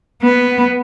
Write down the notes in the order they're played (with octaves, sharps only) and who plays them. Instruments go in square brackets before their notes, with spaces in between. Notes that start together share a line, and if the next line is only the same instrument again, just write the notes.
[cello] B3